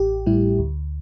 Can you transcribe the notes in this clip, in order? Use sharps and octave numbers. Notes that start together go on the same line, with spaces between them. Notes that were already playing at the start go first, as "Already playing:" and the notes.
Already playing: A1 G4
A2 G3 E4
D2